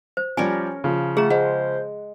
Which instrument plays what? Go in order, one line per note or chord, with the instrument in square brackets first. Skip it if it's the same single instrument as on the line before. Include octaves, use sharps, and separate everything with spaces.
[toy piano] C5
[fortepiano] F3 G3 G4 [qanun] C#4 A#4 C#5 [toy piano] G#5
[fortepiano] C#3 F3
[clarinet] A3 [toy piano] G#4 A#5 [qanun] F#5
[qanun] G#3 [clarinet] C5 [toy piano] F#5